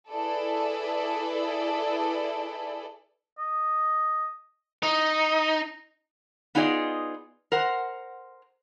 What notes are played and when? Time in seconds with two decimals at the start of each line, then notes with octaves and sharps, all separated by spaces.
0.11 E4 G#4 A4 B4 D5
3.38 D#5
4.83 D#4
6.55 B3 D#4 F4 G#4 D5 D#5
7.52 A#4 C5 F#5